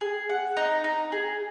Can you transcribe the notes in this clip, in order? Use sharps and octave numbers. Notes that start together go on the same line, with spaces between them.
G#4
F#5
D#4
D#4
G#4